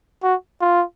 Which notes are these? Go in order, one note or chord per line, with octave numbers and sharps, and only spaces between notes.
F#4
F4